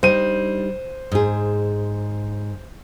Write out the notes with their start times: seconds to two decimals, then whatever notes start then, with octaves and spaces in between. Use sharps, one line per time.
0.03 G3 D4 D#4 C5 D#7
1.12 G#2 G#4